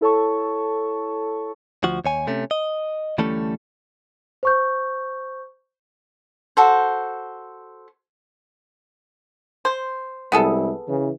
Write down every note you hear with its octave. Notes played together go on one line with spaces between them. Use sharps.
E4 A4 C#5 A5 C#6
D2 F3 F#4
D#2 C#5 G#5
C3 A3 C#4
D#5
D2 E3 G3 A3 C#4 A4
C5 C#6 G6
F#4 A4 C5
C5
C2 G#3 B3 E4 G#4 A4
C#3 E3